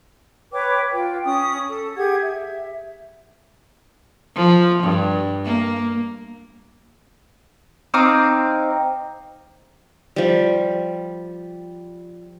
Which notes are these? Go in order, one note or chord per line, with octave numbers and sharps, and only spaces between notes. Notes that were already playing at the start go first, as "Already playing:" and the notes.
B4 C#5 G5 D6
F4 G5
C#4 D#6
A4
G4 G#4 F#5 G#6
E5
F3
G2
A#3
C4 D#4 F5 D6
F3 G3